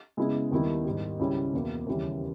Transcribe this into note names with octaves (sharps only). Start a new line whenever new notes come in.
C#3 G#3 B3 E4
D#2 D#3 G3 B3 E4
G#2 D#3 G3
C#2 C#3 G3 C#4 E4
E2 B2 A#3
D#2 C#3 E3 G3 C#4